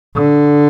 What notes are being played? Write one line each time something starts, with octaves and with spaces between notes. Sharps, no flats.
D3